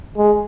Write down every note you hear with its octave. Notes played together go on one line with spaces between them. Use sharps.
G#3